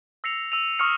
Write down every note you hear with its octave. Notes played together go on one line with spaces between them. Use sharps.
E6 A#6 C7 C#7 F7
E6 D#7 F7
C#6 D#6 F6 C#7